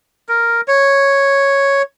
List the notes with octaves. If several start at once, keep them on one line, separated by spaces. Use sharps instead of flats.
A#4
C#5